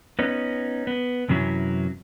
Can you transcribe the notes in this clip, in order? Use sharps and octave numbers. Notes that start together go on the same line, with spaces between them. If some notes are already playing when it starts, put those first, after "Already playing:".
B3 C#4 D#4
B3
F#2 C3 E3 F#3 C#4 E4